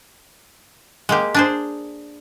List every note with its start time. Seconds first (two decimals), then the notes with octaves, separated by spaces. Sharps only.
1.09 G#3 A#3 G4
1.34 D4 G#4 C5